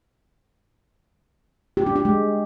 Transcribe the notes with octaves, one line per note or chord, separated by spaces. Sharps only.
G4
D4
G4
G#3